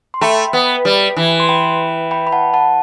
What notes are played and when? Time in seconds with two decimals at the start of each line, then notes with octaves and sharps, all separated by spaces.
0.14 C6
0.21 A3 G5 B5
0.53 B3
0.85 G3
1.17 E3
1.40 C6
1.49 G5 B5
2.11 G5 B5
2.27 B5
2.33 F#5 A5
2.53 F#5 A5